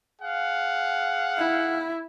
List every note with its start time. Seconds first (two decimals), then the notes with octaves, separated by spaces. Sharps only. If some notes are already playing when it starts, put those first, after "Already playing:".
0.22 G#4 F5 F#5
1.38 E4